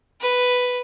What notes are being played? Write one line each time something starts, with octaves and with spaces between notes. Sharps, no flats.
B4